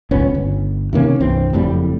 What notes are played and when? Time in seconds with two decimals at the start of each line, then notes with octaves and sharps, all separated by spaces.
0.11 D#1 C#2 B3 C#4
0.34 G1
0.93 C3 D#3 A#3 C#4
1.20 C2 G2 E3 C4
1.53 F#1 F2 A2 G3